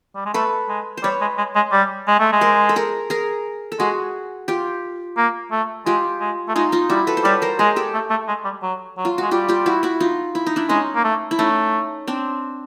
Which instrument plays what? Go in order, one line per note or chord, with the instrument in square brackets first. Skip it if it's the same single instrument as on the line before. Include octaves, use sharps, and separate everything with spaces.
[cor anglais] G3
G#3
[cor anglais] A3 [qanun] A4 B4
[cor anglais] G#3
[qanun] C5
[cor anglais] G3 [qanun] B4 C#5
[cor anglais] G#3
G#3
G#3
G3
G#3
A3
G#3
[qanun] A#4 C5
A4
G#4 A#4
G#4 A#4
A4
[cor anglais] G#3 [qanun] F#4 G#4
[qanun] F4 G4
[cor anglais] A#3
A3
[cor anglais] G#3 [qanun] F4 G4
[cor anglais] G#3
A3
[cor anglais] G#3 [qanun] D#4 F4
[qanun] D#4 F4
[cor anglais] G3 [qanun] E4 F#4
[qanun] A4 B4
C5
[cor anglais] G3 [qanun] B4 C#5
[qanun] A#4 C5
[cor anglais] G#3 [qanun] G#4 A#4
[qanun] G4 A4
[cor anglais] A3
A3
G#3
G3
F#3
F#3
[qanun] F4
[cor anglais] G#3 [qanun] F#4
[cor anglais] G3 [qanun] F4 G4
[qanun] F4 G4
E4 F#4
E4 F#4
D#4 F4
E4
D#4
D4 E4
[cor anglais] G#3 [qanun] C#4 D#4
[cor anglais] A#3
A3
[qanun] E4
[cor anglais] A3 [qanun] C#4 D#4
[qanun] C4 D4